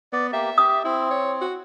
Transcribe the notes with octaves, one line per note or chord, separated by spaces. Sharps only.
B3 D5
A#3 G4 E5
G4 D#6
C4 E4
C#5
F#4